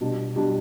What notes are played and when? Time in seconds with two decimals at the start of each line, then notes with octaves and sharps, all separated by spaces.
0.01 B2 G3 D4
0.36 B2 G3 D4